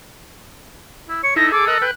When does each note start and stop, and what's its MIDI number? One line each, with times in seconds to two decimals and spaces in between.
1.09 1.19 64
1.23 1.35 73
1.23 1.34 97
1.36 1.52 63
1.36 1.52 64
1.36 1.52 69
1.36 1.46 94
1.52 1.67 68
1.52 1.83 69
1.52 1.67 86
1.67 1.78 70
1.67 1.78 75
1.67 1.81 90
1.82 1.91 71
1.82 1.91 79
1.82 1.92 90